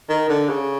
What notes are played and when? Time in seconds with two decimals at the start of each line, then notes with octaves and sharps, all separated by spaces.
0.09 D#3
0.29 D3
0.49 C#3